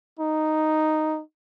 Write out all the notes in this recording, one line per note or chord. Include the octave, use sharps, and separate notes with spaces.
D#4